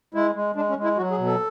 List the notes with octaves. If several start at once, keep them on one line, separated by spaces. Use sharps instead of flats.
G#3 E4
G#3
G#3 D4
C#4
G#3
E4
F#3 F#4
G#4
B2
A4